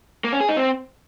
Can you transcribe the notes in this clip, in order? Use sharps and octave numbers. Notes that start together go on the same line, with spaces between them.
A#3
C#4
G#4
D#4
C4